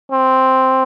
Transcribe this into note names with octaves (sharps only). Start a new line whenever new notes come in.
C4